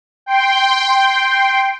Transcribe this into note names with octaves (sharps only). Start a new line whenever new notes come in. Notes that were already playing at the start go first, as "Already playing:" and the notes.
G5 C6